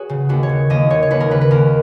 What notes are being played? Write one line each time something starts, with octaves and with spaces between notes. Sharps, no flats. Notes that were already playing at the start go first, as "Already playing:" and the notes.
Already playing: F#4 G#4 B4 C#5
C#3
D#2 F#4
C#5
C#3
D#2 D#5
C#3 C#5
C#5
D#2 B4
A#4
C#3 B4
B4
D#2 A#4